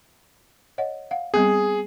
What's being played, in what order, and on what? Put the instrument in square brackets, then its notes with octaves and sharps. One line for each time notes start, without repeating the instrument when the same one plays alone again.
[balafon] C#5 D#5 F#5
F5 F#5
[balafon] G3 B3 C4 [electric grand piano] G#4